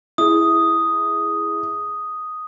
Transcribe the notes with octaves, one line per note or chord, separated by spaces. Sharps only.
E4 G#4 D#6